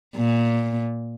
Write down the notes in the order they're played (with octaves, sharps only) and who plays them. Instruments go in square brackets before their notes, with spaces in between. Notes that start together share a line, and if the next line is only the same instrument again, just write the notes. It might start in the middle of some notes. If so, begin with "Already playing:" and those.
[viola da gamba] A#2